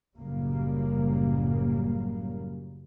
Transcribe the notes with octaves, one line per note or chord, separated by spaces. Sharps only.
F#1 A2 C#3 F#3 G3 A#3